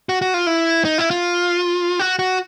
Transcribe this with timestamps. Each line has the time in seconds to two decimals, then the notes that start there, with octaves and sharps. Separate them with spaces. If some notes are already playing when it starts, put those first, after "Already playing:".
0.09 F#4
0.22 F#4
0.34 F4
0.47 E4
0.85 D#4
0.98 E4
1.10 F4
1.99 F#4
2.19 F#4